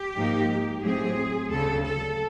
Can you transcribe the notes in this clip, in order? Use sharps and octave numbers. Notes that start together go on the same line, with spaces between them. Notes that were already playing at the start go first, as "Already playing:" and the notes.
Already playing: G4
G#2 F3 A#3 D#4
A2 F#3 A3 C4 G#4
D2 C#3 F#3 A4
A4